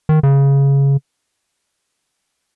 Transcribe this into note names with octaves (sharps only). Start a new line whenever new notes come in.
D#3
C#3